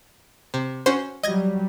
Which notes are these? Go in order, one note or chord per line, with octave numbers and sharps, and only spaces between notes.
C3
C#4 F#4 C5
F#3 G3 D#5 G#6 A#6